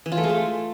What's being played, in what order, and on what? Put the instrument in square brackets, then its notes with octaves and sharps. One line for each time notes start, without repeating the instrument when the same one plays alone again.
[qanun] E3
F4
A3
G#3
A3